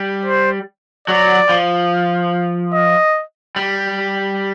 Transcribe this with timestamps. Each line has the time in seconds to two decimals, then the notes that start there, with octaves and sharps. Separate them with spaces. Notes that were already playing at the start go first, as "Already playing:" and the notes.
Already playing: G3
0.26 C5
1.08 F#3 D5
1.49 F3
2.74 D#5
3.56 G3